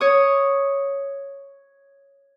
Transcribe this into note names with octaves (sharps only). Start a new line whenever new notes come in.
C#5 D#6